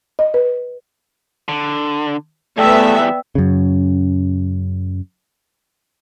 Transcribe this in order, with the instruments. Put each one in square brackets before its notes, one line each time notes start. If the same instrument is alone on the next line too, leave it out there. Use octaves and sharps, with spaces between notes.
[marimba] D#5
B4
[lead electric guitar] D3
[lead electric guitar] E2 G3 [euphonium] A3 [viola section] B3 E5 [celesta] D5 G5 E6
[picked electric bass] F#2 C#3